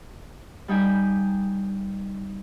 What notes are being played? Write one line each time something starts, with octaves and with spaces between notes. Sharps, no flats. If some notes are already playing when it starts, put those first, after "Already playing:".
G3 D#4 G5 G#5